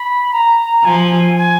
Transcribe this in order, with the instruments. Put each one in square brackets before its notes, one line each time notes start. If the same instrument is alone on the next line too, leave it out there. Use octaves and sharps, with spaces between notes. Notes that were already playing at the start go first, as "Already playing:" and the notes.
Already playing: [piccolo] B5
A#5
[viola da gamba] F3 [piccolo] G#5
[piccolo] G#5